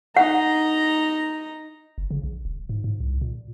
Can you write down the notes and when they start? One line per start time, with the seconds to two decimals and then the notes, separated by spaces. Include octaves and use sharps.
0.17 D#4 F#5 A#5
1.98 F#1
2.11 C#3
2.24 A#1
2.45 D#1
2.69 G#2
2.84 G#2
3.00 C2
3.21 A#2